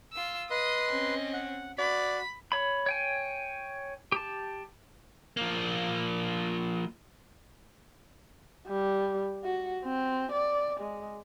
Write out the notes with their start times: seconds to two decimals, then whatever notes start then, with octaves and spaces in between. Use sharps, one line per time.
0.13 F4 E6
0.51 B4 D#5 C6 D#6
0.89 C4 C#4
1.33 F#5
1.78 F#4 D5 B5
2.52 C#5 B5
2.86 C#5 G5 G#5
4.12 G4 A5
5.37 F3 A#3
8.68 G3
9.44 F#4
9.84 C4
10.32 D5
10.80 G#3